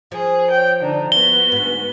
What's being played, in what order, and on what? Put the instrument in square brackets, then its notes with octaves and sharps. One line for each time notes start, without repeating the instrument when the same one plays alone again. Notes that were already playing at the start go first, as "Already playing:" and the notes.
[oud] F3 [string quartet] G#4
[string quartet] C#5 G5
D3 D4 D#4
[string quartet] B3 F#4 B4 [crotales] G7
[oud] D2 G#2